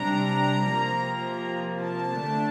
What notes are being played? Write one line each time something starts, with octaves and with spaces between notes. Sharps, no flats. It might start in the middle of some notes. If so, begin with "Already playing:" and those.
Already playing: C3 G3 D4 A#5
C3 F3 A#3
A5
D3 A3 D4